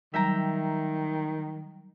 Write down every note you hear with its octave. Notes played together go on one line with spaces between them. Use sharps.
D#3 F#3 G3 E5 G5 A#5